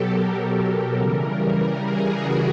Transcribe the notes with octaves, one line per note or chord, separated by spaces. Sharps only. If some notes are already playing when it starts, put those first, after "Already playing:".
Already playing: B2 F#3 G4 A4
A#4
C#3 E3 G3
G#4
F#4